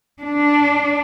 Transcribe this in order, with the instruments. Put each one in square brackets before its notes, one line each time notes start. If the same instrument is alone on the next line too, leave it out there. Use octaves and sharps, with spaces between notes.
[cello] D4